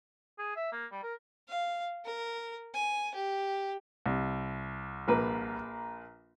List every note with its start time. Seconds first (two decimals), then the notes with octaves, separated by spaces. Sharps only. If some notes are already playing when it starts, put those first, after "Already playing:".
0.38 G#4
0.56 E5
0.72 A#3
0.91 G3
1.03 A#4
1.48 F5
2.05 A#4
2.74 G#5
3.15 G4
4.06 C2
5.08 A#1 A#3 B4